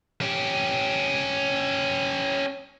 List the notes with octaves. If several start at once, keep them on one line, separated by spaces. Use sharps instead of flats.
C#4 G4